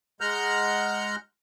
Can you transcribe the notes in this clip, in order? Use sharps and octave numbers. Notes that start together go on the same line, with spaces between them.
G#3 F#5 A#5 F6 G6